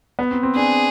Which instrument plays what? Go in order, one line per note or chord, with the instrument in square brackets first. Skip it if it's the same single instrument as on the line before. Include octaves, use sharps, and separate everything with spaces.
[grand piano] B3
C4
C4
[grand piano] D4 [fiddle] G#4